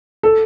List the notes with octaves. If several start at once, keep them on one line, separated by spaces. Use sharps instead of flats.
A4